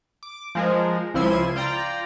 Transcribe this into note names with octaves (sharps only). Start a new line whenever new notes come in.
D6
F3 G#3 A#4
C#2 F3 E4 C6 G#6 D#7
F4 D5 G5 A#5